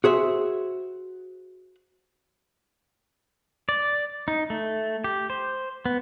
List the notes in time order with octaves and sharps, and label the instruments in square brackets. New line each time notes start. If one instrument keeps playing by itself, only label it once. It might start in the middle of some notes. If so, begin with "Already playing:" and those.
[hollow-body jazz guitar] F#4 G#4 C5 E5
[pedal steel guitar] D5
D#4
A3
G4
C5
B3